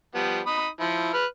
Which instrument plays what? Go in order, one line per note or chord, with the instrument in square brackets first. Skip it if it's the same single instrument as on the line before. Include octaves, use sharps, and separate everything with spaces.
[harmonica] F3 G3 B3
D#4 B5 D#6
F3 E4
B4 F6